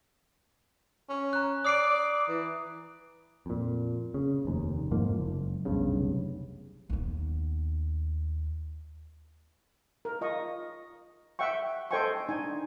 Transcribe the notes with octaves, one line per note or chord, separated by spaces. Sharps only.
C#4
A#5 F#6
D5 D6 D#6 C7 D7
E3
F2 A#2
C#3
F1 D#2
F2 G#2 F3 A#3
F#1
F1 B1 G2 C#3
D#2 B3
A#4
F4 D#5 C#6
E5 F#5 G5 C#6
A4 C5 D#5 G5 G#5 C#6
D4 D#4 G#5